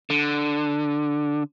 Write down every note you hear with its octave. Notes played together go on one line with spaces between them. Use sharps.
D3